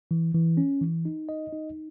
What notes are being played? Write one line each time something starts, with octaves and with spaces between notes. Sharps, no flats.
E3
E3
C#4
E3
D#4
D#5
D#4